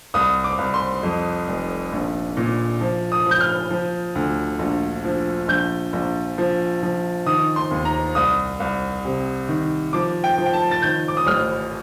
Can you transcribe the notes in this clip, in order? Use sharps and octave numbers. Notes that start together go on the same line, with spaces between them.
C2 D#6
D6
C2
C6
F2
F1
A#1
A#2
F3
D#6
F3 G6
F6
F3
D2
A#1
F3
A#1 G6
A#1
F3
F3
D#3 D#6
C6
D#2
A#5
C2 D#6
C2
C3
D#3
F3 D6
G5
F3
G5
A5
A6
D#3 G6
D6
D#6
A1 F6